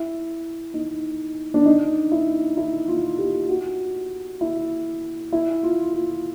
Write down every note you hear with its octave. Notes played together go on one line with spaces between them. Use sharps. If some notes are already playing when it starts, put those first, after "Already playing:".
Already playing: E4
D#4
D4
D#4
E4
E4
F4
G4
F#4
E4
E4
F4
F4